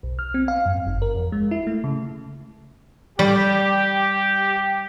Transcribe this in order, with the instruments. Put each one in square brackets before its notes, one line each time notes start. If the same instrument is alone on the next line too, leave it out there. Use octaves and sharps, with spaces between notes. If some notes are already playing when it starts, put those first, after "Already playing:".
[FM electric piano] B1
F6
C4
F5
F#2
G1
A#4
F2
G#3
E4
A3
C#3
[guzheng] G3 D5 [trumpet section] G4